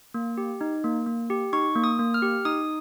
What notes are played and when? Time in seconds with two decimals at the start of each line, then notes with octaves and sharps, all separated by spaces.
0.14 A#3
0.38 G4
0.61 D#4
0.84 A#3
1.06 A#3
1.30 G4
1.53 D#4 C#6
1.76 A#3
1.84 D#6
1.99 A#3
2.14 F6
2.22 G4
2.45 D#4 D#6